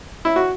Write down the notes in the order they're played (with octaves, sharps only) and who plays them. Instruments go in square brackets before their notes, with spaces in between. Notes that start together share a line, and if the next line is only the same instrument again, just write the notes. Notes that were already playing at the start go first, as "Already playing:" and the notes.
[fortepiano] E4
F#4